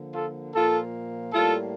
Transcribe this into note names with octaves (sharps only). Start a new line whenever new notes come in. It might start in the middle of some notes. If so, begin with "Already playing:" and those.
Already playing: D3 F3 A#3
F4 A4
A#2 F3 A#3 F4 A4
A2 G3 A#3 F4 A4